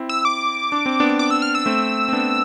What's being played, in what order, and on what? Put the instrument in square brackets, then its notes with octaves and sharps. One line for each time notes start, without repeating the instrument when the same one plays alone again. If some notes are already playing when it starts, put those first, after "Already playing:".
Already playing: [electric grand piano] C4 E4
[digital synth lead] E6
D6
[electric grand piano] D4
C4
B3 D4
[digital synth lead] D6
E6
F6
E6
[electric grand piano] A3 C4
C4
B3 D4